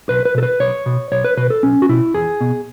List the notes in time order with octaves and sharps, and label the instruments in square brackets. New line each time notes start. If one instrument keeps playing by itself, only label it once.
[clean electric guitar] B1 B4
B4
B2 A4
B4
B1 C#5
B2
B1 C#5
B4
B2 B4
A4
B1 C#4
F#4
B2 E4
E2 G#4
B2